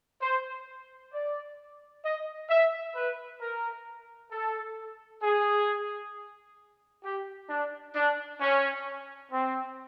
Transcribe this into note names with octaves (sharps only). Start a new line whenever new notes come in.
C5
D5
D#5
E5
B4
A#4
A4
G#4
G4
D4
D4
C#4
C4